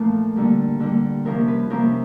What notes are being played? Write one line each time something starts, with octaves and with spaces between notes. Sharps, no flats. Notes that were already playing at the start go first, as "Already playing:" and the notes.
Already playing: A#2 F3 A3 A#4
D3 G3 A#3
D3 G3 A#3
C3 F3 A#3 C#4 A#4
B4
C3 F3 A#3 C#4 A#4